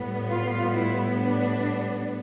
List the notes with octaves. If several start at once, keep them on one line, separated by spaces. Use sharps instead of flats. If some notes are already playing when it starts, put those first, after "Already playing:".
Already playing: A2 G3 B3
F4
E4
D4